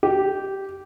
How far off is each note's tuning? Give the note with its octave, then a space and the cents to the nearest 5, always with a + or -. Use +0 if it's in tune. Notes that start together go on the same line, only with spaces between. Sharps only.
G4 -15